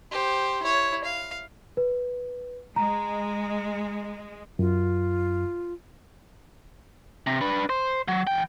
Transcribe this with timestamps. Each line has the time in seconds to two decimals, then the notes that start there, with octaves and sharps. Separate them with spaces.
0.11 G4 C5
0.63 E4 C#5
1.04 F5
1.77 B4
2.76 G#3 A#5
4.59 F#2 F4
7.27 C3
7.41 D4 B4
7.69 C5
8.08 F#3
8.27 E3 G5